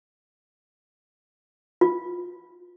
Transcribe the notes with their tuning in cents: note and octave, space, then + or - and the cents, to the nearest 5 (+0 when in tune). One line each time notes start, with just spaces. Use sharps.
F4 +20